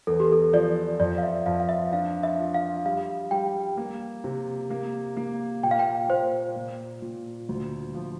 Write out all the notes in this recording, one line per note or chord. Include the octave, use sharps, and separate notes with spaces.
E2 A4
G4
A4
F3 D5
F2 D5
F5
E5
F2 F5
F5
E5
D4 F5
E5
F4
F5
G3 F5
G3 G5
A#3
C3
A#3
A#3
A#2 G5
F5
G5
A#2 C5
A#2
A#2
D2
F3